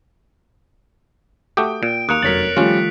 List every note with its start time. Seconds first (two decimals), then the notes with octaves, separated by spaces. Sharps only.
1.57 A3 F#4 G4 G5 D#6
1.83 A#2 D7
2.09 D#2 A#3 D#6 F#6 C#7 F7
2.23 F1 F#2 A#4 C#5 A6 B6 F#7
2.57 D#3 F3 G3 A3 C#4 F4